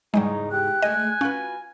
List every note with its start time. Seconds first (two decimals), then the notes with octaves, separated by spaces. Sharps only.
0.14 E2 G#2 C#3 G3 G#3 D#4
0.51 G4 F#6
0.82 D2 G#3 A3 D#5 G#5
1.21 C#4 F4 F#4 B4